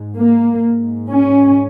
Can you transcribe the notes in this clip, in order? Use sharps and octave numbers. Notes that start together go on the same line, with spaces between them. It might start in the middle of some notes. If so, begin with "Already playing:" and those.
Already playing: G#2
A#3
G#2
C#4